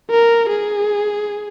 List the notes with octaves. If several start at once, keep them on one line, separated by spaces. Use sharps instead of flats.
A#4
G#4